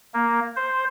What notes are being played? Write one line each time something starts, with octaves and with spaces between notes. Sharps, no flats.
A#3
C5